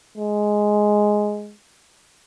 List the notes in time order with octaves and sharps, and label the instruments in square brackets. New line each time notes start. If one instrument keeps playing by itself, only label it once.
[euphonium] G#3